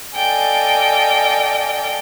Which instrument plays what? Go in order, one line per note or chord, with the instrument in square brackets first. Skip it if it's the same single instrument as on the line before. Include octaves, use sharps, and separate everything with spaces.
[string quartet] A4 D5 D#5 F5 G5 G#5